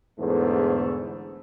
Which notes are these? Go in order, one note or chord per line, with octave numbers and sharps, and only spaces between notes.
E2 G#2 D3 A3 C5